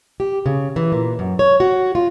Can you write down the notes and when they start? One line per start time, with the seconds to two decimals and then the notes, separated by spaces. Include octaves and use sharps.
0.20 G4
0.46 C#3
0.76 E3
0.92 A#2
1.19 F#2
1.39 C#5
1.60 F#4
1.95 F4